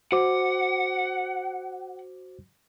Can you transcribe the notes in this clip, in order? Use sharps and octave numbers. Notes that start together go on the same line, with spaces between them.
F#4 C5 F#5 D6